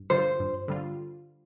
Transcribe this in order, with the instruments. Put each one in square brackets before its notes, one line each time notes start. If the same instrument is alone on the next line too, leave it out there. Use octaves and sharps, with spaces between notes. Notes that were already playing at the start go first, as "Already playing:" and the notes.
Already playing: [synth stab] G2
[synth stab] D3 G3 F4 [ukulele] C5
[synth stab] G2
D3 G3 F4